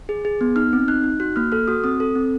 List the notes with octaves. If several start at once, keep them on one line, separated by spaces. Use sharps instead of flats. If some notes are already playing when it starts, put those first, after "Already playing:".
G#4
G#4
B3
D#4 F6
C4
D#4 F#6
D#4
F#4 F#6
A#3 F6
A4 F6
F#4 D#6
C4 D#6
A4
C4